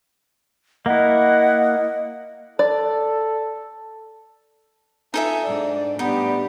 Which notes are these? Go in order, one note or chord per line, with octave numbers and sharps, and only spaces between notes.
A#3 E4 D#5 F#5
A4 D5
D#4 F4 A4 E5 G#5
G#2 D4 D5
A2 G3 B3 D4 D#4 G4